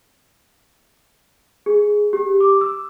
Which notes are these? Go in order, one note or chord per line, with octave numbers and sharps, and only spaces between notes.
G#4
G4
D6
E6